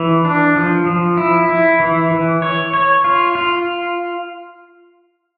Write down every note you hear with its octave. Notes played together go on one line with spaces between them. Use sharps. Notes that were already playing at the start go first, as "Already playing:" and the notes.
Already playing: E3
D4
F3
F3
E4
E4
E3
E3
C#5
C#5
F4
F4